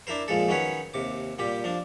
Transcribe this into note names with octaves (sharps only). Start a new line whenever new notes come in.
D4 E4 A#4 C5
A#2 F3 G#3 A4
D#3 F#3 C#4 D#4 B4 C#5
D#2 C3 D6
A#2 G3 G4
F3 D4